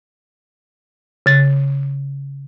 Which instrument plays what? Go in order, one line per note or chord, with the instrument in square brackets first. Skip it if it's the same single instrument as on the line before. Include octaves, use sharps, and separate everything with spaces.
[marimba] C#3 A6